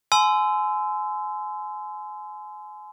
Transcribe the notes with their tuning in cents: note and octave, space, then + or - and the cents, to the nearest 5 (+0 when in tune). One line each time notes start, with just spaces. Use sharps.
G#5 +30 C6 -30 E6 +10